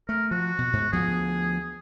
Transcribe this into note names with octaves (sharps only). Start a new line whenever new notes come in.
A3 A#4
F3 F#4
B2
G#2
D2 F3 B3 G#4